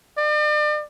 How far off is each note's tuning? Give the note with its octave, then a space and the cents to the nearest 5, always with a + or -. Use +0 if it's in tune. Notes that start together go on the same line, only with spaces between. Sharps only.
D5 +40